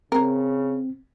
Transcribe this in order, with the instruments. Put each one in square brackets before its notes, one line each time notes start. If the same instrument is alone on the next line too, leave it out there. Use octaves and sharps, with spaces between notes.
[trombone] C#3 [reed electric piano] C4 [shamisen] A#4